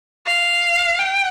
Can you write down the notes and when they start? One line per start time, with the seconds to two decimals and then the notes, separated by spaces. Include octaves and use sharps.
0.27 F5
0.99 G5